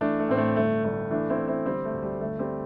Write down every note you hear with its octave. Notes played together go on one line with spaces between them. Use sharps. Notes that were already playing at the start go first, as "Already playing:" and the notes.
E3 A3 D4
A3
A2 C4
A3
G1 A3
G1 A3
E3 A3 D4
C4 E4
E3
C4 E4
D3 G3 C4
A3
D2
G3
G1 A3
G3 C4